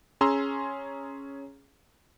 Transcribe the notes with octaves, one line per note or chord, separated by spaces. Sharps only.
C#4 G#4 A#5 C6 E6